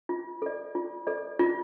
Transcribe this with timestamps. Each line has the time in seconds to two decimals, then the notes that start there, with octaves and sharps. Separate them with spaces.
0.09 F4
0.42 A4 D5
0.75 F4
1.07 A4 D5
1.39 F4